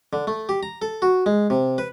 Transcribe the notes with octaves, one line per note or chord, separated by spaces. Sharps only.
D3
A3
G4
A#5
A4
F#4
G#3
C3
B4